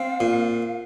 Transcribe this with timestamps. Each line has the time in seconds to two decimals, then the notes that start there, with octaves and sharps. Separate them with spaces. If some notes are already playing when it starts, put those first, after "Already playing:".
Already playing: C4 F5
0.20 A#2